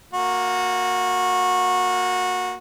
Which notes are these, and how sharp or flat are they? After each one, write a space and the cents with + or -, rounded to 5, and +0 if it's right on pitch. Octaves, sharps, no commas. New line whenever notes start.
A#3 +0 F#4 -20